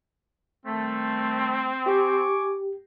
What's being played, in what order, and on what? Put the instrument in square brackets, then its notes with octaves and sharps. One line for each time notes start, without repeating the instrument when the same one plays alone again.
[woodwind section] D#3 G3 A3 [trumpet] C4
[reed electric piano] G4 [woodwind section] G#5 C#6 D6